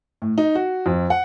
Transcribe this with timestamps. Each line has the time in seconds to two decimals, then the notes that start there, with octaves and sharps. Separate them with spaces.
0.22 A2
0.38 D#4
0.55 F#4
0.86 F2
1.10 F#5